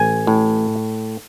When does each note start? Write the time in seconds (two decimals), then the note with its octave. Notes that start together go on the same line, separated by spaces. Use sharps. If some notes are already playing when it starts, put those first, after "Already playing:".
Already playing: A1 G#5
0.27 A2